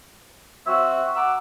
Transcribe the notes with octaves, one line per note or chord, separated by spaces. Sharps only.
C4 F#4 E5
F#5 A#5 D6 E6